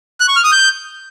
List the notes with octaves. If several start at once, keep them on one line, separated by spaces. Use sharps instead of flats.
F#6
C#6
F6
D#6
G6